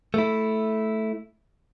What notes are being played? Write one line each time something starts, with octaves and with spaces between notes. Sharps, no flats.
A3 E4